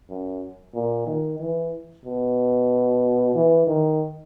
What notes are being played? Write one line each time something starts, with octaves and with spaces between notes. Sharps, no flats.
F#2
A#2
D#3
E3
B2
E3
D#3